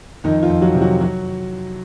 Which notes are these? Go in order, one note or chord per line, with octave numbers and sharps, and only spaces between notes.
F2 D#3 D#4
F3 F4
F2
F#3 F#4
C3
F#3 F#4
F#3 F#4